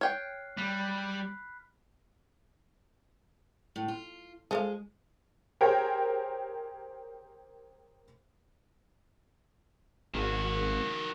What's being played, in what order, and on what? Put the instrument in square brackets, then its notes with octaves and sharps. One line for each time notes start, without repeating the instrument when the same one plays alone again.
[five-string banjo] C#5 G5 [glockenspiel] F6 F#6 C7
[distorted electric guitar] G3 [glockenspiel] B5 F#6 B6
[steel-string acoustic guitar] A2
F4
[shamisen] F3 A4 F5 [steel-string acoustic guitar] G#3
[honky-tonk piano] G4 G#4 A#4 C5 C#5 G5
[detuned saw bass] G#1 [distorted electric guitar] D#3 F#4